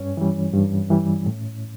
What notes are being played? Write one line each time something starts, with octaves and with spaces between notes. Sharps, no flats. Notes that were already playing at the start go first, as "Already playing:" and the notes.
Already playing: G2 C#4 C#5
E3 G3
G2
E3 G3
A2